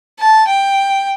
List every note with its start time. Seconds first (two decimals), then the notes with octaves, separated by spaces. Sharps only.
0.20 A5
0.48 G5